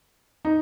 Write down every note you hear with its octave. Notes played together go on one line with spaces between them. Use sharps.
D#4